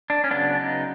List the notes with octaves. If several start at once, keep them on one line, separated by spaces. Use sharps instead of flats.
D4
C#4
C#3 F#3 B3 D4
D#4